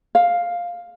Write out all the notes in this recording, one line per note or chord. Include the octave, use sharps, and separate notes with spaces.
F5